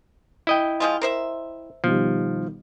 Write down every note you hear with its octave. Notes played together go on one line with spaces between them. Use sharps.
E4 D#5 G5
F3 G#3 F4
A#4 C5 E5
B2 D#3 F3 G3